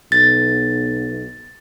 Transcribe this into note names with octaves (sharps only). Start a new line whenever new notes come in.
B1 A6